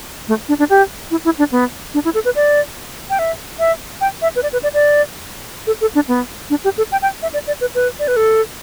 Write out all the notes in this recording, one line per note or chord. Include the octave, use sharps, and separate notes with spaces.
A3
D4
D4
G4
E4
E4
D4
B3
D4
E4
A4
B4
D5
G5
E5
E5
G5
E5
B4
D5
B4
D5
D5
A4
A4
D4
B3
D4
G4
A4
G5
G5
E5
D5
D5
B4
B4
D5
B4
A4